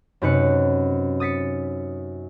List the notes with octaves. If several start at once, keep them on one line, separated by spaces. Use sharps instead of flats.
F#2 C3 D#4 B4 F#6 C#7
D#6 A6 B6 C#7